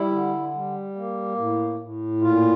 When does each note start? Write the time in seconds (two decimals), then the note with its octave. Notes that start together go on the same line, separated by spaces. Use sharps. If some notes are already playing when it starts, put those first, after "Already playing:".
Already playing: G3 E4
0.11 D3
0.54 G3
0.95 A#3
1.37 A2
1.79 A2
2.21 A#2 F4